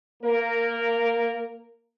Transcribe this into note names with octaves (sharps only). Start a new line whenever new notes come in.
A#3 A#4